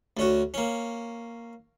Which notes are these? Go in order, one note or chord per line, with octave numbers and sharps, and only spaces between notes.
D2 C#4 F#4
A#3 C#4